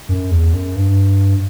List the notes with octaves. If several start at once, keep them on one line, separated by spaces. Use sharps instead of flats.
F#2
E2
F#2
G2